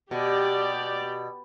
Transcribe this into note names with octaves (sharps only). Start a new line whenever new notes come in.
B2 G4 D5